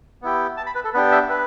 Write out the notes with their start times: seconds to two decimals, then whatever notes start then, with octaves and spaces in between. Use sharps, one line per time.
0.22 B3 E4 G4
0.57 A5
0.66 B5
0.75 B4
0.84 A4
0.94 B3 D4 G4 B4
1.12 E5
1.30 B4